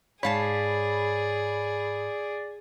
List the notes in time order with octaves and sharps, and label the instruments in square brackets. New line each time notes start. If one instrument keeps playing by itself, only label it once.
[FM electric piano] G#2 B5 [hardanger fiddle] G#4 [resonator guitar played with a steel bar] C#5 F5 A5 [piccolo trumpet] D5